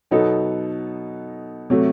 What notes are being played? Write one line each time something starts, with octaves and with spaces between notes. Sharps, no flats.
B2 F#3 B3 D#4 A4
C3 F#3 A3